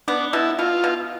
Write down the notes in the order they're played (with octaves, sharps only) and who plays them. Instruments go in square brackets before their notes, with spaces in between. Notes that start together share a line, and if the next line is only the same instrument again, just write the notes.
[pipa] B3 [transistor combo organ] D4
[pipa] B2 [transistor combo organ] E4
[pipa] B2 [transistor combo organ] F4
[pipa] B2